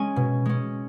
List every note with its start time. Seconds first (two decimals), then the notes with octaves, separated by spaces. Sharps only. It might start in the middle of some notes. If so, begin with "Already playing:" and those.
Already playing: G#3 C#4 G#5
0.16 B2
0.46 G#3 C#4